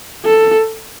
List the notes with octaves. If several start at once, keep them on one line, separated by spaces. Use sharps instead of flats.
A4